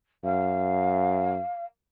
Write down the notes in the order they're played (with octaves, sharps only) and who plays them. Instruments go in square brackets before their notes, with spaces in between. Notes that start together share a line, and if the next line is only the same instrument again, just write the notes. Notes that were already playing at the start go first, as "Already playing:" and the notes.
[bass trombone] F#2 [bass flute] F5